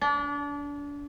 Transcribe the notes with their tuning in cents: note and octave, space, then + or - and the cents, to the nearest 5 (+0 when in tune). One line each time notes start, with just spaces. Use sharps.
D4 -30